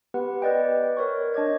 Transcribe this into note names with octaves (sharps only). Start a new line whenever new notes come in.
B3 G4 B4 F#5
B4 D5 D#5 G5
A#4 C#5 C#6
D4 D#5 D6 G#6